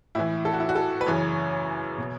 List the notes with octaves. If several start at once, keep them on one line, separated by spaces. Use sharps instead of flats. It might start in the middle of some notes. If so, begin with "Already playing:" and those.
A2 E3 E4
A4
F#4
E4
F#4
A4
B4
F#2 C#3 E3 C#5
B2